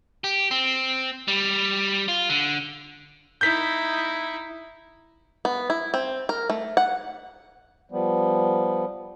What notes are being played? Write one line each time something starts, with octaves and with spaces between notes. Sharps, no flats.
G4
C4
G3
F4
D3
D#4 E4 G6 B6
B3
E4
C4
A#4
A3
F#5
F3 G3 B3